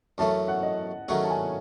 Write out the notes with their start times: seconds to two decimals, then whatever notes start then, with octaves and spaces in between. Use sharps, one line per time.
0.18 F#2 E3 A3 C#4 A5
0.48 F#5
0.63 D#5
1.08 D#3 F#3 A3 C#4 G#4 F#5
1.23 A5
1.30 G#5